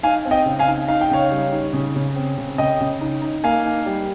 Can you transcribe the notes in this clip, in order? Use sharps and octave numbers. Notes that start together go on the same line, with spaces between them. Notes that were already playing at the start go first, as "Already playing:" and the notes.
D#4 F5 G#5
C4
D#5 G5
C#3
F5 G#5
D#4
D#4 F5
G5
C#3 C#5 F5
G3
D#4
C#3
C#3
C4
C#3
C#3 D#5 G5
C#3
D#4
D#4
A#3 F5 G#5
D#4
G3